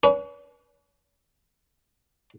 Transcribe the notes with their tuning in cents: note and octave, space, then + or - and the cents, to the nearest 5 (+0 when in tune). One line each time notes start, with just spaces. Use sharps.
C#4 +40 B4 -25